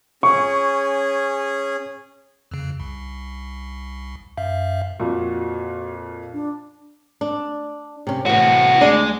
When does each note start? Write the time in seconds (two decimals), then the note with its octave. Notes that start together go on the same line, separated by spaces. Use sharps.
0.23 C#4 G#4 C#6
2.51 F2 C#3
2.80 C2
4.37 F#2 E5 F5
5.00 F2 A#2 F#4
6.33 D4
7.21 D4
8.07 C3 C#4
8.26 A2 C3 E3 F#4
8.81 D2 G#3 D4 D5